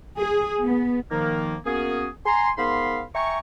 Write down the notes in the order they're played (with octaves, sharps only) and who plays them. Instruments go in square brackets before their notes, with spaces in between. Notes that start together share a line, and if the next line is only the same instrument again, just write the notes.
[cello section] G#4
B3
[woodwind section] D#3 F3 A#3
A#3 B3 C#4 F#4 G#4
G#5 A#5 C6
G#2 B3 A#4 F5 B5 C6
E5 G5 G#5 A#5 C#6